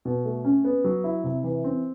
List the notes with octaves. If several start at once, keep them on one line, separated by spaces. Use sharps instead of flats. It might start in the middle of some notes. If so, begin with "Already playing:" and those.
B2
A3
C#4
B3
F#3
E4
C3
E3
C4